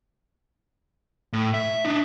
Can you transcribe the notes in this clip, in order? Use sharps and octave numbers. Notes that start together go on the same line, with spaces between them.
A2
E5
D4 D#4